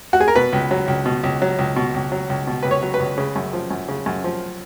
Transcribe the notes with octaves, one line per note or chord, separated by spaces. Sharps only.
F#4
G#4
A#4
B2 B4
C#2
F#3
C#2
B2
C#2
F#3
C#2
B2
C#2
F#3
C#2
B2
C#2 B4
C#5
F#3
B4
C#2
C#3
F#2
F3
F#2
C#3
F#2
F3